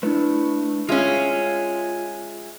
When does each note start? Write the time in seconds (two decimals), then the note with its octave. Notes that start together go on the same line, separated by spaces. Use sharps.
0.03 A3 D4 E4 B4
0.89 G#3 C#4 F4 E5 F5